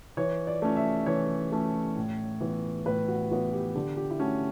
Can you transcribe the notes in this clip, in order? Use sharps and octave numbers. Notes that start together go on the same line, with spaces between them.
E3 C#5
D5
A3 C#4
E5
E3 C#5
A3 C#4
A2
E3 B3
A2 B4
F#4
E3 B3 F#4
G4
D3 G4
G4
E4
A3 C#4 F#4